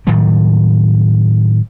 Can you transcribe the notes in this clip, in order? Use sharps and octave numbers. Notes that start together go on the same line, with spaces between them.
A2 D#3 F#3 G3